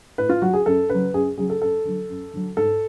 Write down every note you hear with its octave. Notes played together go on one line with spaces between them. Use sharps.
A2 B4
F4
F#3 F#4
G#4
F#2 A4
C#3 F#3 B4
F#2 G#4
C#3 F#3 G#4
A4
F#2 A4
D3 F#3
F#2
D3 F#3
G#2 A4